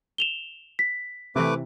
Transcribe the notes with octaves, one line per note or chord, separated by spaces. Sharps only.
E7 F7 G7
B6
C3 E3 A3 B4 D6